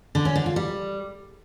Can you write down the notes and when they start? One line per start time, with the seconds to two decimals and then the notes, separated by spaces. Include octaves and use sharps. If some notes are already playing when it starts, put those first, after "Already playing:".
0.15 D3
0.25 C#4
0.36 D3
0.46 F4
0.56 G3